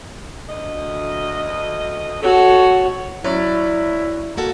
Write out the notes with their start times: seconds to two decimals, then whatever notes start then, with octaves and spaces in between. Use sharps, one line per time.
0.50 D2 D#5
2.23 F#4 A4 C#5
3.24 F#3 C#4 E4 D5
4.37 A#3 F#4 A4